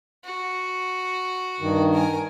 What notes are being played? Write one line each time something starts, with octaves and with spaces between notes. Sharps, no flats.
F#4
G2 D#3
A#4 G#5